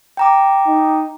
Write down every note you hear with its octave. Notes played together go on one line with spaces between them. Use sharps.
G5 A#5 D6
D#4